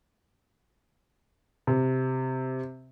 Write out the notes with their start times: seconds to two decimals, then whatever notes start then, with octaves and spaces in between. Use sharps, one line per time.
1.67 C3